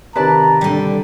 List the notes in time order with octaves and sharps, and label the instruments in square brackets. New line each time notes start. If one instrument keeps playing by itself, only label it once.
[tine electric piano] C3 D#3 [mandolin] B4 D5 A5 [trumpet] A#5
[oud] D3 G3